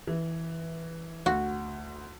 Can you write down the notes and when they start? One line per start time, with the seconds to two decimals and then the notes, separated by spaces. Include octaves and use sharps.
0.07 E3
1.26 D2 F#4